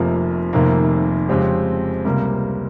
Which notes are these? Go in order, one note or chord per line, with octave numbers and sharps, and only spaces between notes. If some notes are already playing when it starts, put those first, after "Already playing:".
Already playing: F1 F2 C3 F3 A#3
F1 F2 C3 D#3 A#3
F2 C#3 G#3 C4 G4
C#2 C3 G3 A#3